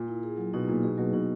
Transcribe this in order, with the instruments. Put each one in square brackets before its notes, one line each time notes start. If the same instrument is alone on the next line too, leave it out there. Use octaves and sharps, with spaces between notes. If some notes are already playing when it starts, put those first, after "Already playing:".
Already playing: [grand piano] A#2
[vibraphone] E4
G#4
F#3
[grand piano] B2 [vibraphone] D#4
[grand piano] A#2 [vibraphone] A#3
[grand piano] B2 [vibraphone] G#4
[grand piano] B2 [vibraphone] F#3
[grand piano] B2 [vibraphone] D#4